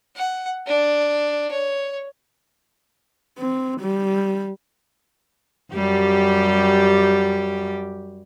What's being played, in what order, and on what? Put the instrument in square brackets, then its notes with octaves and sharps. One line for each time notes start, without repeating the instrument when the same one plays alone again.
[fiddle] F#5
D4
C#5
[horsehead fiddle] C4
G3
[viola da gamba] F#2 G3 G4